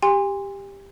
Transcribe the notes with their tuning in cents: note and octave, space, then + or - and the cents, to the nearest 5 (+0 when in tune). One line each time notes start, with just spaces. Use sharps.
G4 +10 G#5 -40 C6 +0